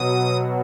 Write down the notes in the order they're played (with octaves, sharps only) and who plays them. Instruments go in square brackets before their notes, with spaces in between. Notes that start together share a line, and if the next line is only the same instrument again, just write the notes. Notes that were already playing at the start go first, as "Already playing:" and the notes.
Already playing: [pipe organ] B2 F#3 D#6